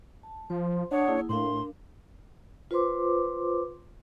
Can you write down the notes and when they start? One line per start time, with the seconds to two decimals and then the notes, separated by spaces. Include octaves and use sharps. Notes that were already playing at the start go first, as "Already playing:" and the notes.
0.23 A5
0.50 F3 C5 C6
0.91 D4 C#5 F#5 A5 D#6
1.07 A#3 E4 G#4
1.29 A2 D4 A#4 F5 C6
2.71 F4 B4 C5 C6 D6